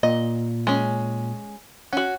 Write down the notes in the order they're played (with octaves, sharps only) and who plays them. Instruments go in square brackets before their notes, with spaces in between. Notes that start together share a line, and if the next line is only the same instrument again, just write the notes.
[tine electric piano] A#2 [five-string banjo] D#5
[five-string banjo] G#3 C#4
[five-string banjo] C#4 F#4 [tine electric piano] F#5